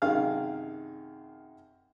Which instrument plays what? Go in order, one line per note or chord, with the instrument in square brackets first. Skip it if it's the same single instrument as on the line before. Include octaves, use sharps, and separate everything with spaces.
[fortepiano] F#2 C3 D#3 G#4 F5 F6